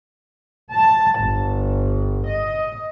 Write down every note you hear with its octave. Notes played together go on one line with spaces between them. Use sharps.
A5
G1
D#5